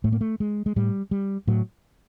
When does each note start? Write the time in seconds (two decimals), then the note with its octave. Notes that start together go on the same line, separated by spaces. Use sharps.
0.04 A2 A3
0.12 A#3
0.21 A3
0.40 G#3
0.66 G#3
0.76 A2 G3
1.11 G3
1.47 A2 F#3